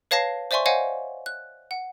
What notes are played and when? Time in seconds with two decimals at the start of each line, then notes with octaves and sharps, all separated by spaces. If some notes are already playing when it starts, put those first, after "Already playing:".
0.11 B4 C#5 F5 A5 A#6 C7
0.51 C5 D5 E5 G#5 C6 C#6
0.66 C5 C#5 D#5 F5 F#5 G#5
1.26 F#6
1.71 F#5